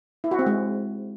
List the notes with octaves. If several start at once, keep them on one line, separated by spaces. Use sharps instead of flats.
E4
F#4
C4
G#3